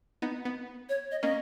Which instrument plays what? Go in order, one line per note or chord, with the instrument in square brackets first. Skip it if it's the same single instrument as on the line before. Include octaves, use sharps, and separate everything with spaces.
[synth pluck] B3 D#4
B3
[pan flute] C#5
D#5
[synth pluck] A#3 C#4 [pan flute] D#5